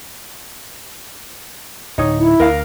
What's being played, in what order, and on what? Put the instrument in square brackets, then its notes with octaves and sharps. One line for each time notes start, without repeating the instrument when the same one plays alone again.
[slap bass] D1 [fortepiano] D#4 C#5 D#6
[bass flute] E4
[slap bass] D2 [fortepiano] A#4 F5